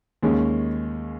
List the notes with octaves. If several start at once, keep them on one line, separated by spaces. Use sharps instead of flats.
D#2 D#3 G#3 C#4